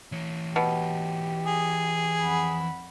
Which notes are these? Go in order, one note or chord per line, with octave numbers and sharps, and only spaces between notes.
E3 C#5
B2 G4
G#4
F2 F#5 B5